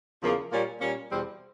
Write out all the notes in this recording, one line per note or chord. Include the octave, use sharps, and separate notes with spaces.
E2 C#3 F3 A#3
A#2 G3 A#3 C#4
A#2 G3 A#3 C#4
E2 B2 G3 C4